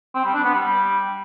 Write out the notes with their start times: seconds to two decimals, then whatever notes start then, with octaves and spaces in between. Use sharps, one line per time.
0.15 C4
0.24 G3
0.34 D4
0.44 B3
0.54 G3